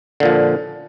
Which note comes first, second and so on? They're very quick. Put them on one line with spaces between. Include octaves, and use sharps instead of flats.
D3 A#2 F3